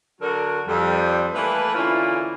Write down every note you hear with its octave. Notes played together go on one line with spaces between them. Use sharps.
D3 F#3 F#4 A4 A#4
F2 G3
E3 A3 A#3 B4
D3 E3 A#3 C#4 E4 F4